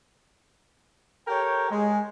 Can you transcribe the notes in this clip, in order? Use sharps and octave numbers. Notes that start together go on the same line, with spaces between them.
G4 A4 A#4 C#5 G5
G#3